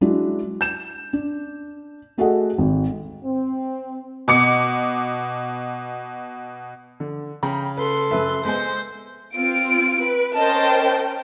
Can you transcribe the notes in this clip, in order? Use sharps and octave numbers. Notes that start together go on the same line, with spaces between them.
F#3 G#3 D4 E4 F#4
G6 E7
D4
A3 F#4 G#4 A4 D#5 F#5
G#1
C4
B2 D6 C#7
D3
C#3 G5 A#5 B5
A4 B4 C6
F#2 C#3 B4 E5
G#3 B3 C5 G#5
C4 F4 D7
B4
C#4 A#4 C5 D#5 G5 A5